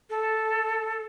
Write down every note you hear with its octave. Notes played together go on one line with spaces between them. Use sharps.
A4